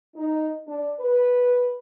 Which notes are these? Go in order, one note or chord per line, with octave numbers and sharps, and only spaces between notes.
D#4
D4
B4